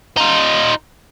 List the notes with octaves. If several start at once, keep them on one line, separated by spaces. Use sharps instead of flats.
D#4 F4